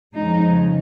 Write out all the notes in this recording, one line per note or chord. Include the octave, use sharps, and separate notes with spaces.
F2 C#3 F3 G#3 D#4